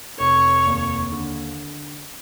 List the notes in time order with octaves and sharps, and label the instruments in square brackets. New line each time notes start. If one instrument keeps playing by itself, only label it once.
[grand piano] F1 [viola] C#5
[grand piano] D#2
D3